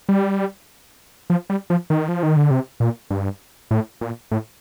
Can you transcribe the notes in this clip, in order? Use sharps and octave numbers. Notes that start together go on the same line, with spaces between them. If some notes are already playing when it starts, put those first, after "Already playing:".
G3
F3
G3
F3
D#3
F3
D#3
D3
C3
A#2
G2
A2
A#2
A2